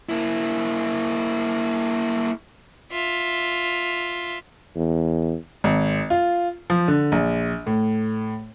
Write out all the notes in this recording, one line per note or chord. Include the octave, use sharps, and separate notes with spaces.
A#3 E4
F4 E5
E2
G#1
F4
F3
D3
A#1
A2